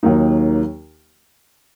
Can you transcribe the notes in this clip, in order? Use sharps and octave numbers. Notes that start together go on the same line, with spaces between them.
D#2 D#3 F#3 A#3 D#4